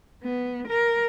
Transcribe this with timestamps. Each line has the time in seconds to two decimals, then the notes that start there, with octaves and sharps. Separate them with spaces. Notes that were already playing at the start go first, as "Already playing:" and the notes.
0.24 B3
0.68 A#4